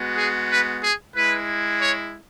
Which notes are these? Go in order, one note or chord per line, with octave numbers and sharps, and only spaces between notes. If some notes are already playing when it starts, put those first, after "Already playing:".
Already playing: G#3 B3 F#4
G#4
B4
G#4
G#3 E4 B4
C#5